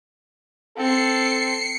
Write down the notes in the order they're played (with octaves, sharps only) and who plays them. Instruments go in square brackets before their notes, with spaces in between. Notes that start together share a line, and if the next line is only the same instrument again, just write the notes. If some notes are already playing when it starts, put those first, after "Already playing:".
[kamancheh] C4 [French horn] A4 [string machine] C7 C#7